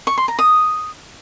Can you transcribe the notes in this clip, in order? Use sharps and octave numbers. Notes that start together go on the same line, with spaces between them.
C#6
C6
A#5
D#6